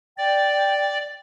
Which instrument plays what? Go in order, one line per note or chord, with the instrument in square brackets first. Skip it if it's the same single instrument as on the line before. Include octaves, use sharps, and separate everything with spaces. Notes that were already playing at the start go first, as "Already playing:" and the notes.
[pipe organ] D5 [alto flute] G5